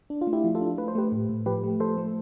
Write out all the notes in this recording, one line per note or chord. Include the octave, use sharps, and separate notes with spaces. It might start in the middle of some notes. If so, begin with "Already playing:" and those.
D4
F4
A3
E4 G4
F3
F4 A4
D4
A3 B4
C5
A3 G4 B4
A2
A2
F3 G4 B4
A3
F3 A4 C5
A3